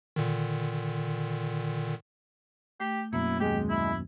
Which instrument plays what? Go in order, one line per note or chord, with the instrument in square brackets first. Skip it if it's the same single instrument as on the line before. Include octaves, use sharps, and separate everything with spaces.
[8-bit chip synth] A#2 D3 D#3
[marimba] A3 [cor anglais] G4
[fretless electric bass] F#2 B2 [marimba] A#3 [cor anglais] E4
[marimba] D#2 D#3 [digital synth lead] G#3 [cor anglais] G4
[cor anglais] E4